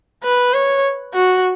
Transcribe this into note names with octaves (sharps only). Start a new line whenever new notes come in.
B4
C#5
F#4